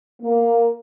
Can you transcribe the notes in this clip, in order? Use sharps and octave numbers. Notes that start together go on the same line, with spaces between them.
A#3